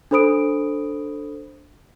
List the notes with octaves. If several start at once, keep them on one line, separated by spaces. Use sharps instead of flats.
D4 A4 C5 B5 D#6 D7